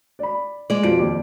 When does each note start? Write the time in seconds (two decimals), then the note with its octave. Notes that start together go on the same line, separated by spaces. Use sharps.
0.19 D5 B5
0.70 G#3 D5
0.83 F2 B2 F4 D7
0.99 D#2 D5 D6